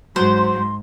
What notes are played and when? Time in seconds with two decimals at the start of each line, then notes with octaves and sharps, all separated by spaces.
0.16 G#2 F#3 C5 C6